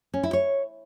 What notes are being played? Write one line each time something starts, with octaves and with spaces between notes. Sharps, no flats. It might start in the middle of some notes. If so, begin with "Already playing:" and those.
C#4
E4
C#5